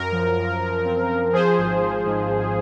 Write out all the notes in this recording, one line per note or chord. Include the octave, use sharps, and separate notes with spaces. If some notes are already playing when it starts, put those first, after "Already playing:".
Already playing: F#2 A#4
F3
F#2
F3
C4
F3
F3 G#4 C5
G#1
G#1
G#2
G#1